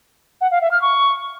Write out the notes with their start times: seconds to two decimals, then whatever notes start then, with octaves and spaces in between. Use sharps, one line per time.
0.41 F#5
0.51 F5
0.61 E5
0.71 F6
0.82 C#6